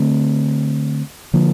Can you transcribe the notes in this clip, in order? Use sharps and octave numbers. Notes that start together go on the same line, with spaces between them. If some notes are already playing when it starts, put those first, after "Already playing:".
Already playing: D3 A3 C4
D3 F3 A#3